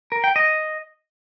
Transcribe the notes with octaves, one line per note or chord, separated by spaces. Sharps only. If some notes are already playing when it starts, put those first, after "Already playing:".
A#4
G5
D#5